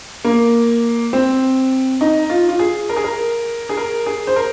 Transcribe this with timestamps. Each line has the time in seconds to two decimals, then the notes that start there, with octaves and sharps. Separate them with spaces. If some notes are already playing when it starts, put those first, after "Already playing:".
0.24 A#3
1.13 C4
2.01 D#4
2.30 F4
2.49 F4
2.59 G#4
2.89 A#4
2.97 G#4
3.04 A#4
3.69 G#4
3.77 A#4
4.06 G#4
4.27 C5
4.36 A#4